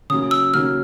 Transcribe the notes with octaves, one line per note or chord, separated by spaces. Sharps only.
C#3 F#3 A#3 D#6
E6
C#3 F#3 A#3 F6